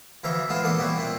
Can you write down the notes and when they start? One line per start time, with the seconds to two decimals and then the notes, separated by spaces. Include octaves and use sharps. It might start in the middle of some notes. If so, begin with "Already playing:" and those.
0.24 D2 E3 F3 E5 A#5
0.49 A2 G#3 B3 F4 A5
0.62 E2 A#2 D3 E3 A4 D#6
0.79 B2 G3 C4 E4 F#4
0.98 A#2 A3 C4